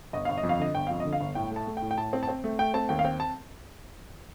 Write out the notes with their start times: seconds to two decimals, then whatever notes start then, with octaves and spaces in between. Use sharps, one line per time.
0.13 G1 D#5
0.25 G1 F5
0.38 D#5
0.43 F2
0.49 F5
0.60 D3 D#5
0.75 G1 G5
0.87 F2 F5
1.00 D#5
1.05 D3
1.13 F5
1.21 G1
1.35 A2 G5
1.51 A3
1.56 A5
1.67 A3
1.77 G5
1.82 A2
1.91 G5
1.98 A2 A5
2.13 C4
2.23 A5
2.28 C4 G5
2.44 A3
2.59 A3 G5
2.74 C4 A5
2.89 D#2 G5
2.99 F5
3.05 C4 G5
3.20 A5